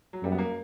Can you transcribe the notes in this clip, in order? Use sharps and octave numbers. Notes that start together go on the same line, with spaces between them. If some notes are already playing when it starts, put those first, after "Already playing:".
F#3
F#2 G3
B3
A#3